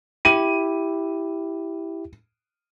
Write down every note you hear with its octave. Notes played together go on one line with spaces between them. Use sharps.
E4 G4 D#7